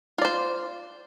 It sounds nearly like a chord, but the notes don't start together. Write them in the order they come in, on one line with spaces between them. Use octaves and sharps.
F4 D5 C5